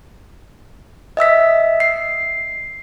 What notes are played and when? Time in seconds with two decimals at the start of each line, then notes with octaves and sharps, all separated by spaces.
1.17 D#5 E5 E6 B6
1.80 C7